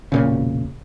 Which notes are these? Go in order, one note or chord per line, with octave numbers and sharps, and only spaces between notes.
E1 A#2 C#3